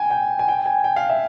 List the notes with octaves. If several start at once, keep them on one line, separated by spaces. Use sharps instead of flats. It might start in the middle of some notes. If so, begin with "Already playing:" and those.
Already playing: G5 G#5
G5
G#5
G5
G#5
G5
F5
E5